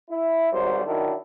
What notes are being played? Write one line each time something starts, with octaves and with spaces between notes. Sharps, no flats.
E4
G#1 B2 F#3 G3 C5
D#3 F#3 D4 E4